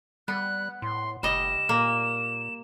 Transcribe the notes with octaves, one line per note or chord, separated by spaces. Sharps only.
G3 B3 F#6
A2 C6
F1 G3 D#5 E7
A#2 A#3